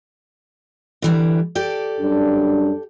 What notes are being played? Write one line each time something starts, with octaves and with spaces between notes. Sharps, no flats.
D3 E3 G3
G4 A4 D5
F#2 G3 D4